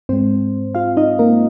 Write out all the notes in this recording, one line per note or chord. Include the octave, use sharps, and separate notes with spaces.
G#2 G#3 C4 C5
F4 F5
D#4 D#5
A#3 A#4